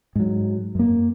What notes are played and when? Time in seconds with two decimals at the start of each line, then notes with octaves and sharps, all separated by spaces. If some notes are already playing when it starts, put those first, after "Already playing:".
0.16 G#2 F#3
0.75 F#2 A#3